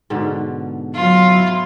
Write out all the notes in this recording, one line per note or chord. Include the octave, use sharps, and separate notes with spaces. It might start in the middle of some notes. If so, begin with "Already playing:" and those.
G#2 B2 D3
F#3 F4
E4